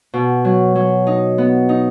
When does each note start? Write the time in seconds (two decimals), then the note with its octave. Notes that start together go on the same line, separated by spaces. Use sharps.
0.14 B2
0.45 F#3
0.75 F#3
1.07 D#4
1.38 B3
1.69 D#4